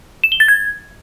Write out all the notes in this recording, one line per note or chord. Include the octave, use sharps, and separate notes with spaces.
E7
G7
A6
G#6